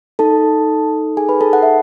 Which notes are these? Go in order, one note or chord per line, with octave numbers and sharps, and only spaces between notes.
D#4 A4 A5
G#4 G#5
B4 B5
A4 A5
F#5
E5